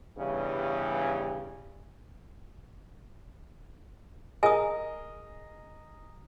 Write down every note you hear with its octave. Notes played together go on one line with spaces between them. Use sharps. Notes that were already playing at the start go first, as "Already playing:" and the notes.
G2 C#3 E3 G3 B3 C#4
G#4 A#4 D#5 G#5 D#6